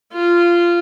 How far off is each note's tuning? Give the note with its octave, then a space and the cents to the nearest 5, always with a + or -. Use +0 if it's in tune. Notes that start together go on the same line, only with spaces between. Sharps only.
F4 -15